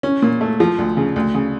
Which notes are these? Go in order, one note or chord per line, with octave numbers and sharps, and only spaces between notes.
C#4
A#2
A3
F3
D2
C#3
D2
C#3